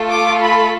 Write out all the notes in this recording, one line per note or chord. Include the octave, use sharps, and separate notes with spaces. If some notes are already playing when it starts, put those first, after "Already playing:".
Already playing: A3 F4 A4
D6
B5